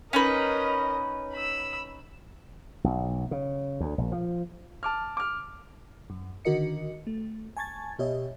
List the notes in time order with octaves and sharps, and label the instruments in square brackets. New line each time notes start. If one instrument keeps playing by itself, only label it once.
[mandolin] C#4 D#4 B4 [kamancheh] A#4 D#5
[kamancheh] B5 E6
[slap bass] B1
C#3
D2
A#1
F3
[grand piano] A5 D6 F6
D6 F6
[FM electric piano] F#2
D3 D#3 F#4 A#4 D#5 C#7
A3
G#5 A5 C#6 G#6 A6
B2 G4 C#5 D#5 E5